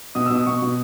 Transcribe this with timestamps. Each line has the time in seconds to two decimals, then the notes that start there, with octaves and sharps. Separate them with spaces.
0.15 B2 D#6
0.26 E6
0.30 B2
0.35 D#6
0.46 B2 C#6
0.62 B2